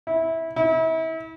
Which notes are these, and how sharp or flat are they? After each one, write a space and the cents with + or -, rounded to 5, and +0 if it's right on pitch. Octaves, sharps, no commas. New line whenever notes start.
E4 -15
E4 -35